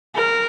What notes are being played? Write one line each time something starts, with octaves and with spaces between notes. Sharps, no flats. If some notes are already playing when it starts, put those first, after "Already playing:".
A#4